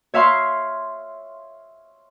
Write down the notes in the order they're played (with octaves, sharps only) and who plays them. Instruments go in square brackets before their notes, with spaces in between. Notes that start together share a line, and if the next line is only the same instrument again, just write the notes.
[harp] C#5 E5 F5 C6 C#6